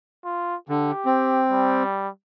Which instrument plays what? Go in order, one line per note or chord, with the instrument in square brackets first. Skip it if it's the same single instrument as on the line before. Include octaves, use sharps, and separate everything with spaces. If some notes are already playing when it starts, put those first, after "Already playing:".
[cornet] F4
[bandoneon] D3 [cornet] G4
[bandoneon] C4
[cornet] G3